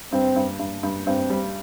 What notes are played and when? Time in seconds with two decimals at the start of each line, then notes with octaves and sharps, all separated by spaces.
0.12 G2 C4
0.36 G2
0.59 G2
0.83 G2
1.07 G2 C4
1.30 G3